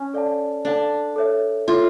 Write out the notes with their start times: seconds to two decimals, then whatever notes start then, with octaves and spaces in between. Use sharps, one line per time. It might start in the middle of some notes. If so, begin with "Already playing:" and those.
Already playing: C#4
0.14 A4 D5 F5 A5
0.65 D4 A4 D5 F5 A5
1.16 A4 C#5 E5
1.67 F4 A4 C#5 E5